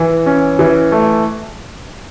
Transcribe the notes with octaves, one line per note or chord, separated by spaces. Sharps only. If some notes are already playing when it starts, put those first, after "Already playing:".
Already playing: E3
C#4
E3
A3